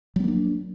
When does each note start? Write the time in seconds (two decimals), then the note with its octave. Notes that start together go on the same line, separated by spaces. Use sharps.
0.16 F#3
0.20 B3
0.24 A#3
0.28 D4